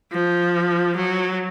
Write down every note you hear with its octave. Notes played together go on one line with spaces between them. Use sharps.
F3
F#3